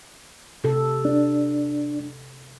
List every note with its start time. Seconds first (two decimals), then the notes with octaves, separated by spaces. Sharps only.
0.64 C3 A4
1.05 D4